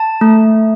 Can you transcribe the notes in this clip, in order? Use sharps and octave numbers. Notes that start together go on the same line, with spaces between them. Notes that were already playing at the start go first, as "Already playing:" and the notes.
Already playing: A5
A3